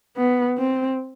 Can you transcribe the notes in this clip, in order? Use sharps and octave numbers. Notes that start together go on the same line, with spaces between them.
B3
C4